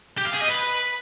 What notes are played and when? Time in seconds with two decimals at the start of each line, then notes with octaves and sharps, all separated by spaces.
0.18 G4
0.25 F5
0.33 G#4
0.41 D#5
0.48 B4